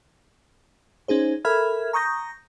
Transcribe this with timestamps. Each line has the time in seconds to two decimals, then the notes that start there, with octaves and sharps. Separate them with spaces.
1.08 C#4 D#4 G#4 C5
1.45 A4 A#4 E5 B5 F6 G#6
1.93 A#5 C#6 D#6 G6 A#6